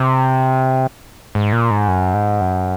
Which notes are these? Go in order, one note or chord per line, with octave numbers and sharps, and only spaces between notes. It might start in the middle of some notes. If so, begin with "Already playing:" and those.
Already playing: C3
G#2
A#2
G#2
F#2
G#2
F#2